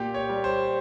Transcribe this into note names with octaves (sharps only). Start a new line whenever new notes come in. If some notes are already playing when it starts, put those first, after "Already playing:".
Already playing: A#2 G4
C#5
G3
C5